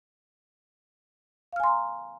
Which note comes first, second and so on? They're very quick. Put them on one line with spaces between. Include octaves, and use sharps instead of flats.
F5 F6 G#5 C6 A#5